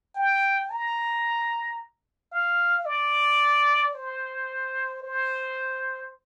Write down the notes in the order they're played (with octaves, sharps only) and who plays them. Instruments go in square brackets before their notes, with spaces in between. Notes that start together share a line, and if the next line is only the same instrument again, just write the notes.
[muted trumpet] G5
A#5
F5
D5
C5
C5